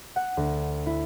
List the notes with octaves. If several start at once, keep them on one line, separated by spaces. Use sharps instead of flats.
F#5
D2
E4